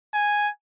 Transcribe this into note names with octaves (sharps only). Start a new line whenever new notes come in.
G#5